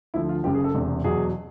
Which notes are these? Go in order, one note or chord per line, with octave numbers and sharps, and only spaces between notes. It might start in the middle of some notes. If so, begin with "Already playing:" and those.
D2 D3 F3 E4
F4
F#1 F#2 C#3 G4
G#4
A4
E1 E2 C3
E2 B2 F#3 G#4